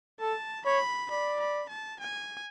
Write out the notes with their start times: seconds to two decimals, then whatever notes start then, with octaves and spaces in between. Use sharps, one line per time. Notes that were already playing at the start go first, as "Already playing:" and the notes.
0.20 A4 A5
0.65 C#5 B5
1.11 D5 B5
1.40 B5
1.69 A5
2.00 G#5